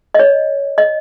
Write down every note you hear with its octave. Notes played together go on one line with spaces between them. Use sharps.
D#5
C#5
D#5